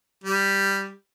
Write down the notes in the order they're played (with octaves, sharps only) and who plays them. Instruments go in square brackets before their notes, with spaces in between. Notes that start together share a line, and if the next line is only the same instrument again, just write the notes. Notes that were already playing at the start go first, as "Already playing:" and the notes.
[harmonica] G3